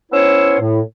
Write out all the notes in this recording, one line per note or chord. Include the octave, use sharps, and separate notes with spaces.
B3 C#4 E4 C5 C#5 E6
A2